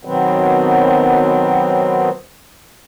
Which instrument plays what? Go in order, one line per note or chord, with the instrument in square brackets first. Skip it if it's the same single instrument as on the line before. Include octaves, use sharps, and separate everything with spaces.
[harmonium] B2 D#3 F#3 B3 C4